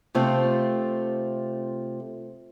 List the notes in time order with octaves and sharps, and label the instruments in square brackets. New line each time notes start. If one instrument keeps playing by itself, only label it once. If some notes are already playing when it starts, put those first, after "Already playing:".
[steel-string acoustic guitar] C3 A3 C4 F4 A4